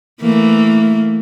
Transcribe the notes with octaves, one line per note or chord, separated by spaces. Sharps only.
E3 A3 A#3